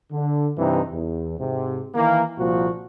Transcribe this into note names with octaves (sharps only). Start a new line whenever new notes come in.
D3
G2 C3 E3 C4 D#4
E2
G#2 C3
D#3 E3 A#3
C2 A#2 F3 A#3 F#4